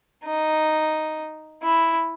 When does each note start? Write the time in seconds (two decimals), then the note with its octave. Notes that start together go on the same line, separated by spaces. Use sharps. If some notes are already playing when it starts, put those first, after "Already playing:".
0.24 D#4
1.62 E4